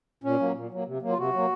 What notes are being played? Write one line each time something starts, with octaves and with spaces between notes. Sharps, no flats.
A#2 C#4
F#3 A#3
A#2
F#3 A#3
C3
F#3 A#3
F4
C3 F#4
F#3 A#3